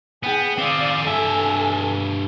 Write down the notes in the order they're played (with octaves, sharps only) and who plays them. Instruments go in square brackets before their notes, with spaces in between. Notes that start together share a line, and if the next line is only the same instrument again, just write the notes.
[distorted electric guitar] B3 [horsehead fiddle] G#4 G5
[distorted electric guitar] C4 G#4 [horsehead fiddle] D5 F5
[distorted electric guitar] G2 E5 [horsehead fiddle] A4 G#5